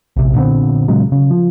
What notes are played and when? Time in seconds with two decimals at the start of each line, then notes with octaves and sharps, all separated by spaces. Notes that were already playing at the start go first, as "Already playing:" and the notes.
0.16 A#1 C3
0.35 A#2 D3 B3 C4
0.88 A#2 C#3 F#3 G#3
1.12 C#3
1.31 F3